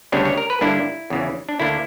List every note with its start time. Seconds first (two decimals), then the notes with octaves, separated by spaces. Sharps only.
0.12 D2 C#3 G3 B3 D4 C#5
0.25 C#5
0.37 A#4
0.50 B4
0.61 G2 D3 A#3 D4 E4
1.10 E2 C#3 E3
1.49 D4
1.60 D2 D3 A#3 D4 E4